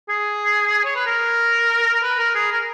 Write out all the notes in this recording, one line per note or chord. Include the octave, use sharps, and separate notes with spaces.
G#4
C#5
B4
A#4
A#4
B4
A#4
G#4
A#4